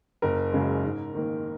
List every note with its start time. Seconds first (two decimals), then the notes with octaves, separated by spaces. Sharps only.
0.22 F#1 A#4
0.52 F#2 C#3 G#3
0.83 G#2
1.15 D#3 A#3